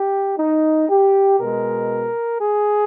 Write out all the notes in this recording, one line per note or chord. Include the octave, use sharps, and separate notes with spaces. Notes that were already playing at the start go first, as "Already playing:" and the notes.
Already playing: G4
D#4
G4
B2 G#3 A#4
G#4